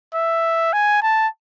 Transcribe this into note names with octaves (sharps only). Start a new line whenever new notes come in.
E5
G#5
A5